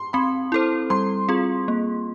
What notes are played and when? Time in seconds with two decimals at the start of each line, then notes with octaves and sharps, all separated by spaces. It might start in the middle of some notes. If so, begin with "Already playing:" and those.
Already playing: C6
0.13 C4 B5
0.52 E4 A4 C5
0.90 G3 C6
1.28 C4 F4 G#4
1.68 A#3